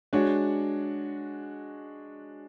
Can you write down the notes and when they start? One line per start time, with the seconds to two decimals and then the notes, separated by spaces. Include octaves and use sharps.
0.13 G#3 D4 F#4 C#5